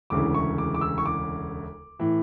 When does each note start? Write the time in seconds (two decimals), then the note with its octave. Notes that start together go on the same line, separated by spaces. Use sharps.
0.10 E1 D2 C#3 E3 D6
0.34 C#6
0.58 D6
0.74 D6
0.81 E6
0.98 C#6
1.05 D6
1.99 A2 E3